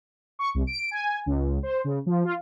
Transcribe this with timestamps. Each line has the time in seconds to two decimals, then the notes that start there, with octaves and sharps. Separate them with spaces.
0.39 C#6
0.54 C2
0.67 D7
0.91 G#5
1.26 C#2
1.63 C5
1.84 C#3
2.06 F3
2.25 F4